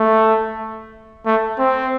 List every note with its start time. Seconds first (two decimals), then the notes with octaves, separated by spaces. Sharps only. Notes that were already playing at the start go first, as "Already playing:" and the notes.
Already playing: A3
1.26 A3
1.59 C4